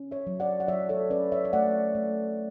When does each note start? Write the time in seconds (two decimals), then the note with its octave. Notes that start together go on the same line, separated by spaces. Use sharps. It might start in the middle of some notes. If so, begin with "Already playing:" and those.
Already playing: C#4
0.11 C#5 E5
0.27 F#3
0.40 D5 F#5
0.60 F#5
0.68 F#3 C#5 E5
0.89 A4 C#5
1.10 C#4 B4 D5
1.32 C#5 E5
1.45 E5
1.53 A3 D5 F#5
1.95 A3